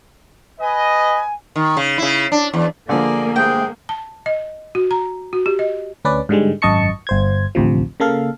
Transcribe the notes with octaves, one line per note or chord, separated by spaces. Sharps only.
B4 D#5 G#5
D#3
C#3
C#3 E4
D4
E2
D3 F3 A#3 G#4 D5
G2 G#3 C5 G5
A5
D#5
F#4
A#5
F#4
G4
D#5
D2 C#4 B4 D5
G#2 D3 G3 G#3
G#1 F#2 D#5 A5 C#6 C#7
G1 C5 G#6
A1 D2 C3 F3
C#3 A#3 A4 F5